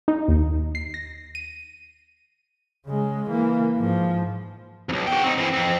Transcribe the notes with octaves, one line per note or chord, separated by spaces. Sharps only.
D#4
D#2
C7
A#6
D#7
C#3 G#3
E3 A#3
G#2 F3
B1 F2
F#4 G5
C4 D#4
E3 C4
F2 C4